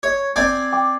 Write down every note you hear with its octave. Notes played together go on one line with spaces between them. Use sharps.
C#5
C4 D5 G#5
G5 D6